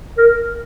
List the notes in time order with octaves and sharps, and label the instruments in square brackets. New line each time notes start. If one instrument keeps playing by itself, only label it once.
[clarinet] A#4